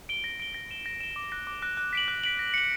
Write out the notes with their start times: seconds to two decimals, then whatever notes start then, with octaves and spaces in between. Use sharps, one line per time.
0.09 D7 G7
0.24 A#6
0.40 D7 G7
0.54 A#6
0.71 E7 G7
0.86 A#6
1.01 E7 G7
1.16 D6
1.32 F#6 A#6
1.47 D6
1.62 F#6 A#6
1.77 F#6
1.93 B6 D7 F#7
2.08 F#6
2.24 B6 D7 F#7
2.39 A#6
2.54 C#7 F#7